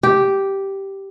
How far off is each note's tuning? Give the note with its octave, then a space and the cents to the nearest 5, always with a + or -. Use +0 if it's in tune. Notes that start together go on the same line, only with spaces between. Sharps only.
G4 -5